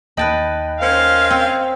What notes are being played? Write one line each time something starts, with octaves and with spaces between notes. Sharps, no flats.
D#2 B4 D#5 G5 A5 B5
C#4 A#4 C5 F5
C4